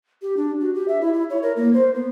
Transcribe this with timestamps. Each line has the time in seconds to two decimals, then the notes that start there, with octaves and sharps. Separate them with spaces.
0.22 G4
0.37 D4
0.61 F#4
0.75 G4
0.88 E5
1.01 E4
1.13 E4
1.30 C#5
1.43 A#4
1.57 A#3
1.74 C5
1.95 B3